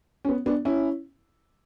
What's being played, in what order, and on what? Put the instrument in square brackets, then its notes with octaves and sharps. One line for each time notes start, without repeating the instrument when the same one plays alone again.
[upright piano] C#4
B3
B3 D4
C#4 E4